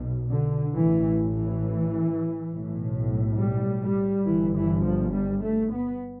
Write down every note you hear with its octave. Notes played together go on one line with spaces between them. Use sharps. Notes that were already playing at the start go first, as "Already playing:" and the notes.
Already playing: B1 B2
D3
A1 A2 E3
E3
B1 A2
G3
G3
G1 G2 E3
E3
F3
G3
A3
B3